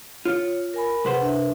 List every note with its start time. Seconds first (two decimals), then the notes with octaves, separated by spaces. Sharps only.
0.25 F4 C#5
0.74 A#4 G#5 B5
1.05 C2 G#4 B4 C5 F#5 C6
1.21 D4 E5